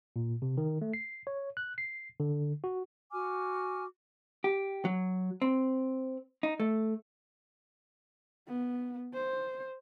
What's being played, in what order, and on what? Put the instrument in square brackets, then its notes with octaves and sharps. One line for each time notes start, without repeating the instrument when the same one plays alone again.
[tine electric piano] A#2
C3
D#3
A3
C7
C#5
F#6
C7
D3
F#4
[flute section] F#4 G#5 D6 F6
[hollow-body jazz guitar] G4
F#3
C4
D#4
A3
[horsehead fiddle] B3
C5